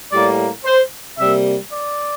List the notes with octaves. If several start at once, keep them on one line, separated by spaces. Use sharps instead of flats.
A2 G3 A#3 D5
C5
C3 G3 A#3 E5
D5